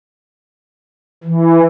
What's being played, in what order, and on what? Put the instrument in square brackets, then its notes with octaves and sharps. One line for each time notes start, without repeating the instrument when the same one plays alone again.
[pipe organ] E3